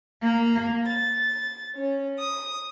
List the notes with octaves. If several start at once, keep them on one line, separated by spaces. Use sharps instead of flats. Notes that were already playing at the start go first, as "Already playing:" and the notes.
A#3
A6
C#4
D#6